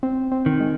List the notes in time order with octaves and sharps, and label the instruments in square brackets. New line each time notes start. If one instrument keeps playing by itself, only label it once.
[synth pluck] C4
C4
[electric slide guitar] D#3
[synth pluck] G#3